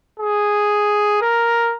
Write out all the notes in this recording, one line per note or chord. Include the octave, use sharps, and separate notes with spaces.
G#4
A#4